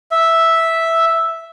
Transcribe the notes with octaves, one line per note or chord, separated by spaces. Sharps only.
E5